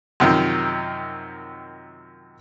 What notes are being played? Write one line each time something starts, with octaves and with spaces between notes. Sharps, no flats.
F#2 C3 D#3 F3